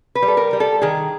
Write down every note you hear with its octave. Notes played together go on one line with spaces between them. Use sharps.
B4
G3
A4
A#4
G3
A4
D#3 G#4